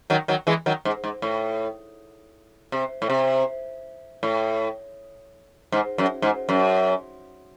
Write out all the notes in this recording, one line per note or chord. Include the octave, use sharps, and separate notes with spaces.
D#3 F#3
D#3 F#3
E3 G#3
D#3 F#3
G#2
G#2
A2
C3
A2
C3
A2
G#2
F#2
G#2
F#2